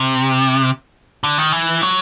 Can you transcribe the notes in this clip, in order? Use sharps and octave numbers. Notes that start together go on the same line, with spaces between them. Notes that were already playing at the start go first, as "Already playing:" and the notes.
Already playing: C3
D3
D#3
E3
F#3